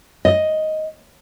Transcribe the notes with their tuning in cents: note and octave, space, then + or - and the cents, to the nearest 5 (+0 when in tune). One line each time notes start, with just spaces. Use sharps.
D#5 +5